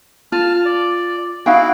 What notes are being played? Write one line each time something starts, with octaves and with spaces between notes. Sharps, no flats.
F4 A5 F6
D5
D#4 E4 F#4 F5 G5